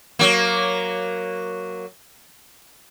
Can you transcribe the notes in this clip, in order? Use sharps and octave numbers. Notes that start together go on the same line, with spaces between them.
F#3 A#3